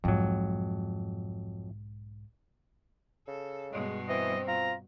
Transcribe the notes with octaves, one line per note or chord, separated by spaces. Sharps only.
B1 F2 G#2 F#3
C#3 A4
G2 B2 G#3
E3 C4 D#5
F4 A#5